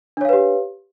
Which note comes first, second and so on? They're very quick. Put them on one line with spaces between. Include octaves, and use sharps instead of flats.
D4 C#5 F5 B4 G4